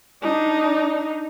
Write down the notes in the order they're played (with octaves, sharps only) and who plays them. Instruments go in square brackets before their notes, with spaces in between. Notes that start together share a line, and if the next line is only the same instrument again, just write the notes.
[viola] D4 D#4